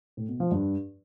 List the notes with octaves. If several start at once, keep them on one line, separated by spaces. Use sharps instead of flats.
A2
B2
F3
G2